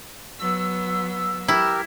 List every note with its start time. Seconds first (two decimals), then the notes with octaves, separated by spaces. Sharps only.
0.39 F#3 B3 E6
1.48 E4 G4 A#4